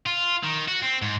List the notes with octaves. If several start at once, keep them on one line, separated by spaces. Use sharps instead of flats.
F4
D#3
F#4
C4
G#2